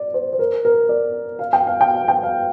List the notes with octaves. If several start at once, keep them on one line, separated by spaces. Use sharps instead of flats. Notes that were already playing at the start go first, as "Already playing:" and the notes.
Already playing: D5
C5
C5
A#4
A#4
D5
F5
G5
F5
G5
F5
G5
F5